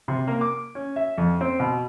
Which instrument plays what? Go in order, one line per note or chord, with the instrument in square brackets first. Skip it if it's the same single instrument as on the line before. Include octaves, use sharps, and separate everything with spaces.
[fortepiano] C3
A#3
D6
C#4
E5
F2
C4
B2